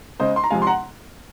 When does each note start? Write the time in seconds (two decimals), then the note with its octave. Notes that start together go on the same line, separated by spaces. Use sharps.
0.20 C#3 G#3 C5 D#5
0.36 C6
0.44 A#5
0.50 C3 F3 G#3 F5 G#5
0.62 C6
0.67 F#5 A#5